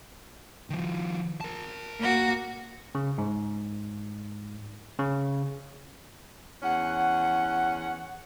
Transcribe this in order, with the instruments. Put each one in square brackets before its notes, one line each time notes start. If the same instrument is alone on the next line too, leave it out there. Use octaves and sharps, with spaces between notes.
[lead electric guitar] D#3 F3
A#4 A5
[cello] A#3 F#4
[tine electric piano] C#3
G#2
C#3
[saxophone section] E2 C#4 F#5